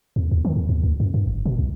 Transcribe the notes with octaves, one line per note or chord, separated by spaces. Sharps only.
E2
D#2
D#3
E2
D#2
D2
F#2
G2
G1
B2
C2